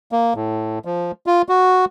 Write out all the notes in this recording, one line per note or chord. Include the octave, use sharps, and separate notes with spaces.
A#3
A2
F3
F4
F#4